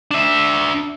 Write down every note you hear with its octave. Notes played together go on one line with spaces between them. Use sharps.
D4 E5